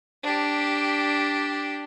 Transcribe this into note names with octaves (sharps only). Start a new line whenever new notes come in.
D4 G4